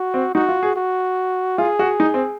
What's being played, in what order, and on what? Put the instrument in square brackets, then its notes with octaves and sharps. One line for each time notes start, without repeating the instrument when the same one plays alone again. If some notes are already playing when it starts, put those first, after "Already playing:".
Already playing: [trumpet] F#4
[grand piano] C4
[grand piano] D#4 [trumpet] F#4
[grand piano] F4
G#4
[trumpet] F#4
[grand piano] F4 [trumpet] G#4
[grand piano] F#4
D#4
C4